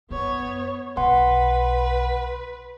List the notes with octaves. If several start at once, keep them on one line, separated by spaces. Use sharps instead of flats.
F#2 B3 C#5
B1 B4 F#5 C6